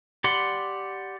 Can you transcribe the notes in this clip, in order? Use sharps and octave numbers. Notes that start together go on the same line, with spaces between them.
G4 D5 F#5 B5 C6